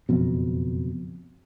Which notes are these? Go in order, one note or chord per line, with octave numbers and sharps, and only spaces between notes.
F#1 F2 B2